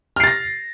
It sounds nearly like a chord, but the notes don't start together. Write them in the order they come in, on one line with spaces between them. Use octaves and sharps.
F6 C7 A6 A#6